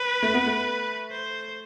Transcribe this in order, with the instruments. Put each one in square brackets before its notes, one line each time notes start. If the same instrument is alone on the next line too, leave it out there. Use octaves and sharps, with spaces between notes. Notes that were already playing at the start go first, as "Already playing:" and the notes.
Already playing: [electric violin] B4
[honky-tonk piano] A3
B3
A3
[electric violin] C5